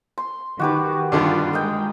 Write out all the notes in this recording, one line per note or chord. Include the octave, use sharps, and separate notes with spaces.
C6
D#3 F#4 G4 B4
G2 D3 D#3 F4
G#3 A#4 D#5 G5